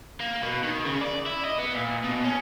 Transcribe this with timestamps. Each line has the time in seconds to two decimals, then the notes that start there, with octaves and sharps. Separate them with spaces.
0.20 A#3
0.42 B2
0.63 D#3
0.85 C#3
1.01 D5
1.26 E4
1.45 D#5
1.58 B3
1.75 A#2
2.04 B2
2.25 C#4